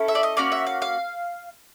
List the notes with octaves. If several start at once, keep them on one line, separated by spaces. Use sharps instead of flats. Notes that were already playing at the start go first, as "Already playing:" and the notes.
Already playing: C#4 E4 A4
E5
D5
D#5
A#3 C#4 F#4 D5
E5
F5
F5